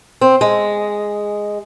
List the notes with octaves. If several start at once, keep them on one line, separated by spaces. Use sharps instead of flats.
C4
G#3